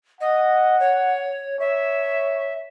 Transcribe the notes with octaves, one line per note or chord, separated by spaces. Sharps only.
D#5 F#5
C#5
C#5 E5